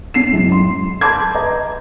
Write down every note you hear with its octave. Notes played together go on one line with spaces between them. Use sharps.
C#4 C7 E7
B1 F#2 A2 G#3
C6
A5 B5 C6 D6 G6 G#6
B4 D#5 A#5